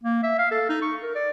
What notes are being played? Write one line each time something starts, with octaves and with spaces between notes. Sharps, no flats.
A#3
E5
F5
A4
D#4
C#6
A#4
D5